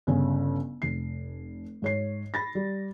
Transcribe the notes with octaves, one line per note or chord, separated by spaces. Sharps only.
G1 C#3 C#4
F1 C7
G#2 C#5 C7
B5 A6 A#6
G3